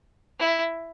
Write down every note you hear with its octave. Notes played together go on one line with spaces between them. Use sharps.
E4